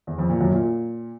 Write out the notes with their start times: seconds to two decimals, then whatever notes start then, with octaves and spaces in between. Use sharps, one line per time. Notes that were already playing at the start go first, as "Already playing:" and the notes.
0.07 E2
0.18 F2
0.30 A#2
0.41 F#2
0.52 A#2